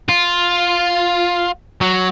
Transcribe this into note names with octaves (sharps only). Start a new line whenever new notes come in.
F4
F#3